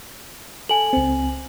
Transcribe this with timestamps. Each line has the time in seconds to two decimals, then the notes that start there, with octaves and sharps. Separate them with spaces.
0.69 A4 G#5 F#7
0.93 C#2 C4